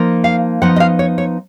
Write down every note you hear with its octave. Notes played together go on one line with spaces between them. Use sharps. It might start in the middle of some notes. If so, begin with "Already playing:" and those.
Already playing: F3 A#3 D#4
F5
F3 B3 D#4 F#5
D#5
F5
C#5
C#5